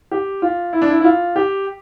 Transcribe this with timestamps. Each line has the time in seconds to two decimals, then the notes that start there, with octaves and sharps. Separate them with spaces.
0.11 G4
0.42 F4
0.73 E4
0.82 D4
0.90 E4
1.00 E4
1.04 F4
1.36 G4